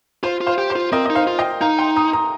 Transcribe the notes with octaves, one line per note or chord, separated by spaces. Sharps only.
F4 C5
F4
C5 F5
G4
C5
F4
C4 A#4 D#5
D#4 D#5
C5 F5
F4
D#5 G5
D#4 F5 A#5
G5 C6
A#5 D#6
A#5 D#6